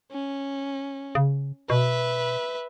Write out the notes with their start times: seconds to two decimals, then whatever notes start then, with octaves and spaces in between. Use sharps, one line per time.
0.12 C#4
1.15 C#3
1.70 B2 B4 E5